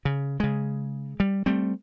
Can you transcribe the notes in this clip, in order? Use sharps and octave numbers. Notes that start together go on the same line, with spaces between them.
C#3
C#3 G#3
G3
G3 A3 C4